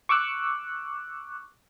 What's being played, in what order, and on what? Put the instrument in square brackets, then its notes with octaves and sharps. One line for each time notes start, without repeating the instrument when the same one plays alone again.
[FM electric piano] C#6 D6 E6 F#6